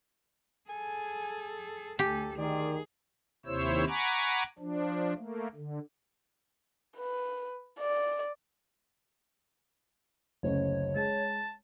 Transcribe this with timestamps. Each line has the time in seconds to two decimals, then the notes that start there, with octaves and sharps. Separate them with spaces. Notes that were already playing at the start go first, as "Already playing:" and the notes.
0.69 G#4 A4 G#5
1.99 D2 G4 A4 G#5
2.38 D#3 G#4 D5
3.46 D#2 C3 E4 C5 C#5 E6
3.88 F#5 G#5 A#5 B5 C#6 D6
4.59 F3 D4
5.16 A3 A#3
5.55 D3
6.97 B4
7.79 D5
10.43 F#1 D2 C#3 C#5
10.96 G#3 A5